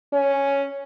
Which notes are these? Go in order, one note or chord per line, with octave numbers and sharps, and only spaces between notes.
C#4